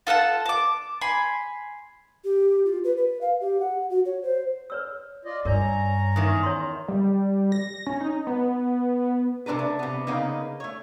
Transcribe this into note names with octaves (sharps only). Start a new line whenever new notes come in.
F4 A4 F#5 A5
A5 D6
G#5 B5 C6
G4
F4
B4
B4
F5
G4
F#5
F#4
C#5
C5
B4 C#5 E6
F4 D5 D#5
G2 C#4 A#4 C#5 D5 A#5
E2 D#3
C#5 A#5 C6
G3
A#6
C#4
D#4
B3
C3 C4 D4 A#4 B4
A3
C3 B3
C#3 A#3 B3 D#4
A3 C#5